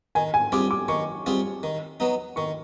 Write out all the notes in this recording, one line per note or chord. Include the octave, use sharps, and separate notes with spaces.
D#3 G#5
G#5
G3 C4 F4 G#4 D6
D6
D#3 C#6
G3 C4 F4 G#4
D#3
F#3 B3 D#4
D#3 C#6